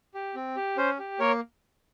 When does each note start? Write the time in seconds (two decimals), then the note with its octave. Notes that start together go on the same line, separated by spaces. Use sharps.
0.14 G4
0.35 C4
0.56 G4
0.77 C#4 C5
0.99 G4
1.19 A#3 A#4 C#5